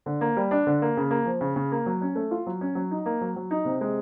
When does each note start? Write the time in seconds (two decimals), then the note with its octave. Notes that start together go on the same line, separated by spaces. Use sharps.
0.06 D3
0.21 A#3
0.37 G3
0.51 D4
0.67 D3
0.82 A#3
0.97 C#3
1.11 A#3
1.26 F3
1.41 C#3
1.56 C#3
1.72 A#3
1.86 F#3
2.01 C#4
2.15 A3
2.31 F4
2.46 F#3
2.61 C#4
2.75 F#3
2.91 D#4
3.06 A#3
3.21 F#3
3.36 F#3
3.51 D#4
3.65 C3
3.81 G#3